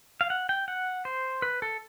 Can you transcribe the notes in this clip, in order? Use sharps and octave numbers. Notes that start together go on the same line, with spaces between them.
F5
F#5
G5
F#5
C5
B4
A4